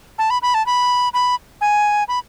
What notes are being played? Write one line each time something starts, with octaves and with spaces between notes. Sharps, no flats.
A5
B5
B5
A5
B5
B5
G#5
B5